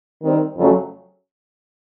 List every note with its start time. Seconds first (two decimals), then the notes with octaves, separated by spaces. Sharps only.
0.23 D#3 G3 C4
0.57 F2 C#3 F#3 A3 C#4